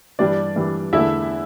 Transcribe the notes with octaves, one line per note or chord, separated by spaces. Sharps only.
G2 E3 G3 D4 D5
G2 E3 G3
E2 D3 A3 E4 E5